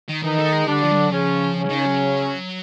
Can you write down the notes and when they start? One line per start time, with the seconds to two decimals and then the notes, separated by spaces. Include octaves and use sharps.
0.09 D#3
0.23 D#3 E3 D#4
0.38 A3
0.53 G#3
0.67 D3 G3 D4
0.82 F3
0.92 G3
0.98 F#3
1.11 C#3 F3 C#4
1.56 C#3 C#4
1.70 D#3
1.85 F#3